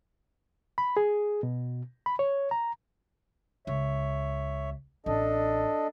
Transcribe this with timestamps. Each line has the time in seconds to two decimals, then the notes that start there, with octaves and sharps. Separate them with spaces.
0.78 B5
0.97 G#4
1.43 B2
2.06 B5
2.19 C#5
2.51 A#5
3.67 C#2 C#5 E5
5.06 A1 D4 A4 D#5